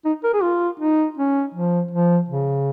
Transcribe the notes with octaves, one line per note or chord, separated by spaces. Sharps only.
D#4
A#4
G#4
F4
D#4
C#4
F3
F3
C#3